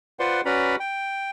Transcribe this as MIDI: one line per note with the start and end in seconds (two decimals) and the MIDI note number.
0.20 0.41 65
0.20 0.41 71
0.20 0.41 72
0.20 0.41 74
0.20 0.41 78
0.20 0.41 84
0.45 0.76 61
0.45 0.76 66
0.45 0.76 71
0.45 0.76 74
0.45 0.76 82
0.45 0.76 83
0.80 1.31 79